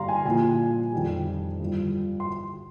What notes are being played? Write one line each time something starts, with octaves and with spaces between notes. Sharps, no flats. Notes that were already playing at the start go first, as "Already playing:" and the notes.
Already playing: G2 G3 F5 A#5 C6
G#5
A#2 F3 G#5
F2 D#3 G3
G2 F3
C6